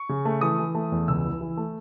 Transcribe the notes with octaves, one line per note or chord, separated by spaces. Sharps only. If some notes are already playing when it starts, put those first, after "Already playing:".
Already playing: C#6
C#3
A3
E3 D#6
E3
A3
E2
C#2 E6
E3
E3
A3